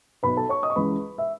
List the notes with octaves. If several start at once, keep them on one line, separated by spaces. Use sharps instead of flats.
B1 B2 B4 B5
A4 A5
C#5 C#6
D#5 D#6
C#6
C#2 C#3 E3 B4 B5
E5